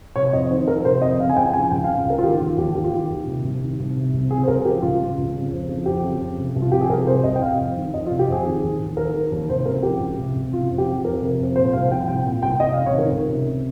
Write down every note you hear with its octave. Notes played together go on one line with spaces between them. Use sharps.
C3 C#5
F2 D#5
D#3 C5
F2 A#4
C3 C5
F2 D#5
C#3 F5
G#5
C#2 G5
F3 G#5
C#2 G5
F5
C#3
F5
C#2 A#4
F4
D#3 G4
D#2 F4
D#2 G4
D#3 G4
F4
D#3 G4
D#2
C3
C2
D#3
C2
C3
C2
C#3 G#4
C5
C#2 A#4
F3 G4
C#2 F4
C#3
C#2
C#3
F2
F3
F2 G4
C#3
F2
C3
C2
F4
F3 G4
G#4
C2 A#4
C3 C5
C2 D#5
G5
C3 F5
F2
D#3
F2 D#5
F4
C3
G4
F2 G#4
D#3
D#2
D#2
D#3 A#4
D#3
D#2
C3 C5
C#2 A#4
F3 G4
C#2
C3
C#2
C3 F4
F2
G4
F3
F2 A#4
C3
F2
A#2 C5
C2 F5
F3 G5
C2 G5
A#2
C2 G5
C3 D#5
F5
C#2
C#5
D#3 A#4
C#2
C3